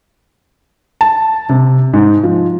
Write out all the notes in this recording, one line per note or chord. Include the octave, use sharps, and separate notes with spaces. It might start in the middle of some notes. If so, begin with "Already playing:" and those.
A5
C3
G#2
F3